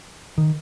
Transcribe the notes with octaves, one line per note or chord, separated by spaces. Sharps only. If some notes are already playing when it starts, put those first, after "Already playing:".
D#3